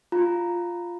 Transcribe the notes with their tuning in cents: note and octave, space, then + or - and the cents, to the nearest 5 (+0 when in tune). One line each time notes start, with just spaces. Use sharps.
F4 +0 A#5 +0